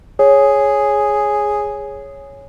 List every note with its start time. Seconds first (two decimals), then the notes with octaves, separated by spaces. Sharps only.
0.19 G#4 C#5